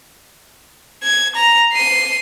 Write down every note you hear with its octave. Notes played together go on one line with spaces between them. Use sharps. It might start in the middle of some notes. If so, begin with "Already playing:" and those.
G#6
A#5
C7 D#7